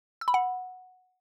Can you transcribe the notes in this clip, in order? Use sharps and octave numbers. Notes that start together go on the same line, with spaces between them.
E6
B5
F#5